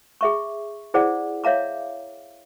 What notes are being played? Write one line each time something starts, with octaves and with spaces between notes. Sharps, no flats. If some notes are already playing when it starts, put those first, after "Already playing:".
G#4 E5 C#6
E4 G#4 C5 D5 F#5
C#5 E5 F5 A#5 D6